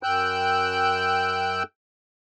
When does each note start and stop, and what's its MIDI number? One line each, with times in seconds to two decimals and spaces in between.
0.03 1.63 42
0.03 1.63 79
0.03 1.63 88
0.03 1.63 90
0.03 1.63 91